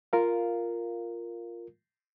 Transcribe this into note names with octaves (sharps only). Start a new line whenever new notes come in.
F4 A#4 F5